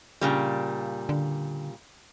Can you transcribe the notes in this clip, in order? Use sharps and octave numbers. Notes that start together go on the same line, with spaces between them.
A#2 C#3 G3
D3